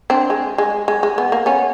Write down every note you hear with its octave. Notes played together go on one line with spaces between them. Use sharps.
C4 D4
G#3
G#3
G#3
G#3
B3
A#3
B3 C#4